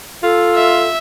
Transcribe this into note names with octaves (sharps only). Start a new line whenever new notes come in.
F4 A4
E5